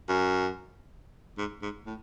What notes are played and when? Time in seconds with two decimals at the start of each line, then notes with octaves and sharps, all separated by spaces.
0.09 F#2
1.38 G#2
1.62 G#2
1.87 A2